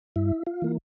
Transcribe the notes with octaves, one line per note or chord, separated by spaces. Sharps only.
G2 E4
F4
E3 A#3